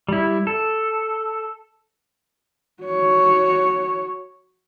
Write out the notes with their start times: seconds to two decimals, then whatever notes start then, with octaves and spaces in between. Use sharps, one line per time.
0.08 G3 E4
0.47 A4
2.83 F#4 C#5